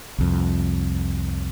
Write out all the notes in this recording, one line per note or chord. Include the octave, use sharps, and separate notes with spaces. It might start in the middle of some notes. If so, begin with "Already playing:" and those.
C2 F2